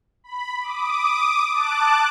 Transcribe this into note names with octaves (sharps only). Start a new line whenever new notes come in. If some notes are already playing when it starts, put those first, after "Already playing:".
B5
D6 D#6
A5 D6 F#6